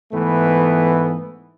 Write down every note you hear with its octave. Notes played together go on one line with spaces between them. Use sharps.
G#2 E3 A3 B3